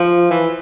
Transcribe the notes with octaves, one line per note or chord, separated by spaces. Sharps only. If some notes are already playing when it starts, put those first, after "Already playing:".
Already playing: F3
E3